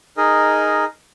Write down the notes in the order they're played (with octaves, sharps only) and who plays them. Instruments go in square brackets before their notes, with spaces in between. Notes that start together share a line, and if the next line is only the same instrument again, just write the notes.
[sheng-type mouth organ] D#4 G#4 A#4 D#5